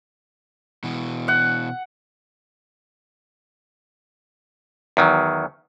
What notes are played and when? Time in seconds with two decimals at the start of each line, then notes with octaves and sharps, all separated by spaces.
0.84 B2 E3
1.28 F#5
4.97 E2 D#3 F#3